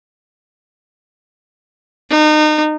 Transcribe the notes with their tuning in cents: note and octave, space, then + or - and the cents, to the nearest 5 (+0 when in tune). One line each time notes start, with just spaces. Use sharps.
D#4 -30